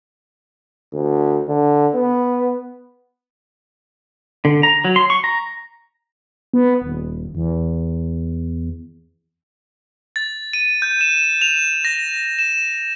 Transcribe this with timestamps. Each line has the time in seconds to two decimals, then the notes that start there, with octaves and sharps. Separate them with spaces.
0.93 D2
1.48 D3
1.94 B3
4.45 D3
4.63 A#5
4.85 F#3
4.96 C6
5.10 C#6
5.24 A#5
6.54 B3
6.82 D#1
7.35 E2
10.16 A6
10.53 D#7
10.82 G6
11.01 E7
11.41 F7
11.85 A#6
12.39 E7